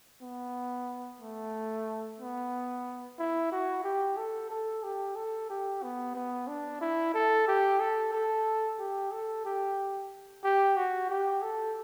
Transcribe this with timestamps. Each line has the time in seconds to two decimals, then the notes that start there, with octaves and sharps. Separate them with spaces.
0.22 B3
1.21 A3
2.20 B3
3.19 E4
3.52 F#4
3.84 G4
4.17 A4
4.50 A4
4.84 G4
5.16 A4
5.50 G4
5.83 B3
6.15 B3
6.48 D4
6.81 E4
7.14 A4
7.48 G4
7.80 A4
8.13 A4
8.79 G4
9.12 A4
9.46 G4
10.44 G4
10.76 F#4
11.09 G4
11.42 A4